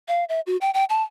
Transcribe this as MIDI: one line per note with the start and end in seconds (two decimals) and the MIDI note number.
0.08 0.24 77
0.29 0.40 76
0.47 0.57 66
0.61 0.71 79
0.74 0.84 79
0.90 1.03 81